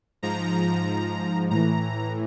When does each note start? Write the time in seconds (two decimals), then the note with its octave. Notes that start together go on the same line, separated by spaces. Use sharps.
0.23 G#2 F3 A#5
1.50 A2 E3 A#5